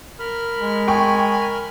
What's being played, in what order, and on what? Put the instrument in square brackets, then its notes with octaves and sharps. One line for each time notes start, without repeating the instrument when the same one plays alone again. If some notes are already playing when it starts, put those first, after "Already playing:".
[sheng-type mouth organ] A#4 B5 F6
[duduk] G#3
[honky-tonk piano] G5 C#6 [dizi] G#5